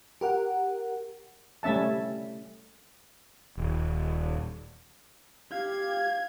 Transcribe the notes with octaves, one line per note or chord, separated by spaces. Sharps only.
G4 A#4 F#5
G3 A3 C#4 E5 A5
D#1
G4 F5 G#6